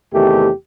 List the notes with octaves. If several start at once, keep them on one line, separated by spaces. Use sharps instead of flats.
E2 C3 D#3 A3 G4